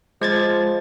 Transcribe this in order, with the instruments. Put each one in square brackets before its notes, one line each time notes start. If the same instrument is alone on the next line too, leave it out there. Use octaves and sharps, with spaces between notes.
[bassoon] F3 [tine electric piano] G#3 G#6 A6